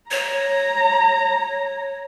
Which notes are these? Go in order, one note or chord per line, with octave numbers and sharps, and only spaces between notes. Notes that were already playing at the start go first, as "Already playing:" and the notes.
C#5 A#5